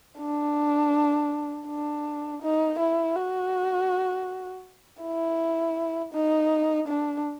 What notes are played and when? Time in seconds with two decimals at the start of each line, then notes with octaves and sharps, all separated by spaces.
0.19 D4
1.67 D4
2.42 D#4
2.79 E4
3.16 F#4
5.02 E4
6.13 D#4
6.87 D4